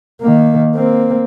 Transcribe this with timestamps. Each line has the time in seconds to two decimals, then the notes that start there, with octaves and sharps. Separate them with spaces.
0.21 D#3 A#3
0.75 A#3 C4